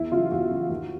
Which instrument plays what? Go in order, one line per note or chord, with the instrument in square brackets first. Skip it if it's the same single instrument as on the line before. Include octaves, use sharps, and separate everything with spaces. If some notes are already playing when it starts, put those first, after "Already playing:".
Already playing: [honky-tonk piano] E2 E4
C#3 F#3 F4
E2 F#4
C#3 F#3
D#2